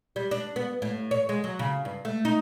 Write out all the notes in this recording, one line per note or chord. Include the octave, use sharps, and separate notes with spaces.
G3
D4
B3
A2
C#5
G#3
F#3
C#3
G2
A3
D#4